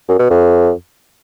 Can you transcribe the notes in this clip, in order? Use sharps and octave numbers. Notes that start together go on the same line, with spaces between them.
F#2
B2
F2